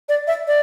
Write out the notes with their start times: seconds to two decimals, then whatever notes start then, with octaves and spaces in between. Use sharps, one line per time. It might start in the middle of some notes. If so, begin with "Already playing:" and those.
0.09 D5
0.27 E5
0.48 D5